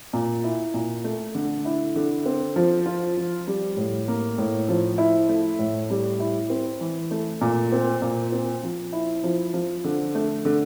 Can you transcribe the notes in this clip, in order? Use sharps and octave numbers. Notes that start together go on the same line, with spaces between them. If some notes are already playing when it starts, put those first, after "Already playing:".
A#2
E4
A#2
A3
D3
E4
D3
C4
F3
F4
F3
G3
A2
A#3
A2
F3
E4
A3
A2
G3
E4
C4
E3
A3
A#2
C4
A#2
C4
F3
E4
F3
F3
D3
A3
D3